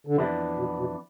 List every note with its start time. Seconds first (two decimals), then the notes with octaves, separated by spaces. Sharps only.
0.07 D3
0.16 F2 C3 E3 B3 D4
0.58 B2
0.78 B2